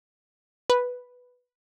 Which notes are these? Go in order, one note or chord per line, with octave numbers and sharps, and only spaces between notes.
B4